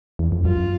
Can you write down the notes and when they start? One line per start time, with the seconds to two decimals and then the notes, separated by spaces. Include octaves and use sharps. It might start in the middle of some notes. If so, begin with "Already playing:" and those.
0.19 E2
0.32 F2
0.45 F#2 F4